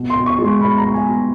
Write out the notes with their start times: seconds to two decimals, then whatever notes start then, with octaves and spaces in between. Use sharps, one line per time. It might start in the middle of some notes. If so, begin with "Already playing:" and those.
Already playing: B2
0.10 C6
0.15 B2
0.26 C#6
0.38 G#3
0.44 C6
0.60 B2 B5
0.78 A#5
0.84 B2
0.94 G#5
1.06 B2